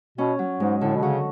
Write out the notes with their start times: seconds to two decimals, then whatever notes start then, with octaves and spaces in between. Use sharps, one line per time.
0.18 B2 C#4
0.39 F#3
0.60 G#2 G#3
0.81 A2 D3
0.96 B2
1.02 C#3 F#4